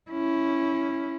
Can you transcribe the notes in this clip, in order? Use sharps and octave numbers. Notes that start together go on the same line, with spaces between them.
C#4 E4